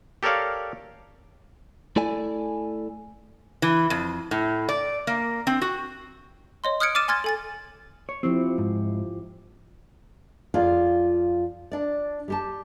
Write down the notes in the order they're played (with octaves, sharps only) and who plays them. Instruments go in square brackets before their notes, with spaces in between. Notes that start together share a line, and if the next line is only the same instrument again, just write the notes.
[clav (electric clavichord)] G4 A4 A#4 C#5 D5 F5
[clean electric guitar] A3 E4 A4 D5 G#5
[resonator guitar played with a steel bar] E3
F2
A2
D5
A#3
C4
F#4
[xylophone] C#5 D#5 C6
D#6 F6 F#6 G#6 C#7 D7
D6 F6 A6 D#7 E7
G#5 C6 F6 G#6 A6
A4 G#5 A6
[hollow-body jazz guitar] C#5
[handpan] F3 E4 G4 [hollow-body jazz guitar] C4
[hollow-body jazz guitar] G#2
[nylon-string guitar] F2 F4 G#4 D5 F5
D4 D5
G3 G4 A5